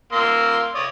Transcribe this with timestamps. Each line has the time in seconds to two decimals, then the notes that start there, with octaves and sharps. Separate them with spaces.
0.13 A#3 C6 E6
0.75 C#5 D5 D#6